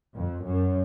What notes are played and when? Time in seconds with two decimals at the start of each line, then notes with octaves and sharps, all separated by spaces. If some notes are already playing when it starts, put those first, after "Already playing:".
0.14 F2
0.44 F#2